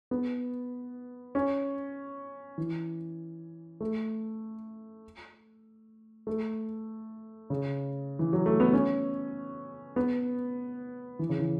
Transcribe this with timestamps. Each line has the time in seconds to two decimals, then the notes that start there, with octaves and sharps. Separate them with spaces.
0.11 B3
1.35 C#4
2.58 E3
3.81 A3
6.27 A3
7.50 C#3
8.19 E3
8.33 F#3
8.46 A3
8.60 B3
8.73 C#4
9.96 B3
11.19 E3
11.29 C#3
11.39 E3